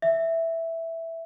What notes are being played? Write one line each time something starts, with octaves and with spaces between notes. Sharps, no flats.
E5